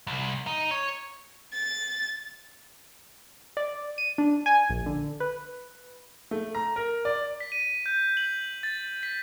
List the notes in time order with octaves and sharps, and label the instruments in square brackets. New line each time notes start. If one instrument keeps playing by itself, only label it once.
[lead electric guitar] C2
D#4
C#5
[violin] A6
[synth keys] D5
D#7
D4
G#5
A#1
D3
B4
[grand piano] A3
A#5
A#4
D5
[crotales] B6
D#7
G6
F#7
A6
B6